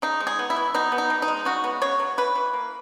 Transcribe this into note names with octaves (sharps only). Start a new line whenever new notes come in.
C#3 D#4
G#3
G#4
B3
E4
E3
B2 D#4
B3
D#4
B2
D#4
G#3
C#3 F#4
B3
C#3 C#5
F#3
E3 B4
E3
A#3